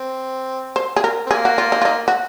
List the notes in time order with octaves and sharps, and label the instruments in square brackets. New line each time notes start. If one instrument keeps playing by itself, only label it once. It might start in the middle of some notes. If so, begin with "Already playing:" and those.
Already playing: [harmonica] C4
[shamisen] C5
G#4
A#4
[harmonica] C4
[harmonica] A#3 [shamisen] G#4
[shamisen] F#4
F4
D#4
F4
D#4
F#4